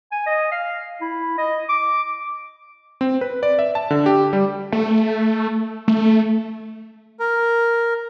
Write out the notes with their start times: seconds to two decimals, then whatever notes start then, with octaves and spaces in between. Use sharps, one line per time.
0.12 G#5
0.26 D#5
0.52 F5
1.01 E4
1.38 D#5
1.69 D6
3.01 C4
3.21 B4
3.43 D5
3.59 E5
3.75 A5
3.90 D3
4.06 G4
4.33 G3
4.72 A3
5.88 A3
7.19 A#4